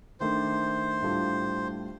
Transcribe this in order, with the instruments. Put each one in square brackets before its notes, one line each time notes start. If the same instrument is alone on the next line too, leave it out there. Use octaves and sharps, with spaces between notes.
[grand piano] D#3 A3 D4 A4 [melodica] C5
[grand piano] A2 G3 D4 F4 A4